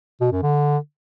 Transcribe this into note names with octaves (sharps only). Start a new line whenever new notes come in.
B2
F#2
D3